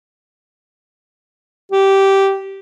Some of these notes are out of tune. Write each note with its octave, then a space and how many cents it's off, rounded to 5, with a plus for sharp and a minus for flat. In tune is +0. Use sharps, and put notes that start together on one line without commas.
G4 -10